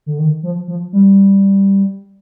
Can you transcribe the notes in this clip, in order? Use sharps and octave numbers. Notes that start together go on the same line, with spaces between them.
D3
D#3
F3
F3
G3